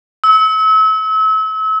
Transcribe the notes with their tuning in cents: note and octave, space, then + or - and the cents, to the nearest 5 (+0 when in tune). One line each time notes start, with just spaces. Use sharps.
E6 -35